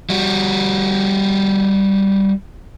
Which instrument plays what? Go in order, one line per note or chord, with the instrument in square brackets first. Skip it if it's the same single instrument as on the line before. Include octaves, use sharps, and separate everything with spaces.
[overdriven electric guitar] G3 F#4